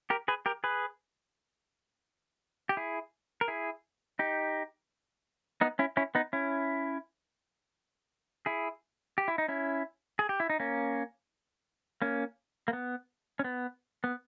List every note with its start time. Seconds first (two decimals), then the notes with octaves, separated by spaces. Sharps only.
0.10 G4 A#4
0.28 G#4 B4
0.46 G4 A#4
0.64 G#4 B4
2.69 G4
2.77 E4 G#4
3.41 A#4
3.48 E4 G#4
4.19 D#4 G4
5.61 B3 D#4
5.79 C#4 E4
5.97 C#4 E4
6.15 B3 D#4
6.33 C#4 E4
8.46 E4 G#4
9.18 G4
9.28 E4
9.38 D#4
9.48 C#4 E4
10.19 G#4
10.29 G4
10.40 E4
10.50 D#4
10.60 A#3 C#4
12.02 A#3 C#4
12.68 A#3
12.73 B3
13.39 C#4
13.44 B3
14.04 B3